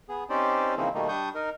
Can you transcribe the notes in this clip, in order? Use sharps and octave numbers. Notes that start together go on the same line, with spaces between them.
B3 G#4
C4 C#4 D#4 G4 C5 D5
C#3 E3 F3 A#3 C4 D#4
B2 D#3 G3 A3 A#3 D#4
G3 D4 C#6 D#6 G6
D#4 A#4